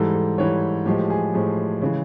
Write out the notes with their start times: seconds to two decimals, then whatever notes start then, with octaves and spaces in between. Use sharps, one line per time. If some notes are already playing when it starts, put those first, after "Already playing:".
Already playing: G#2 E3 G3 A4
0.14 A4
0.38 G#2 E3 G3 C#5
0.86 A2 F3 G#3 G4
1.10 G#4
1.34 A2 F3 G#3
1.82 C#3 E3 G#3